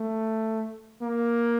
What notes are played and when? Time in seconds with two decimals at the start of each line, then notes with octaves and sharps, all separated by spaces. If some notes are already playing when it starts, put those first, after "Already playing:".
Already playing: A3
1.02 A#3